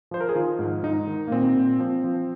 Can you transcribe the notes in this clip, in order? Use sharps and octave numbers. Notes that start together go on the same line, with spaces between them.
F3 C5
A#4
G#4
D#3 F4
G#2
G#2 D#4
D#3
A#3
A#2 C4
A#2
F3 C4
F3